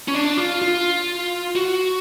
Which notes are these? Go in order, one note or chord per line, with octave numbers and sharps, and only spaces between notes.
C#4
D4
F4
F4
F#4